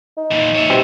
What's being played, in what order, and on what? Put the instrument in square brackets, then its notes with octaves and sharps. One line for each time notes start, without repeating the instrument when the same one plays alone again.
[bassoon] D#4
[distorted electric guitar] A#2 E3
C#5 E5
[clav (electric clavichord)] B2 G3 C4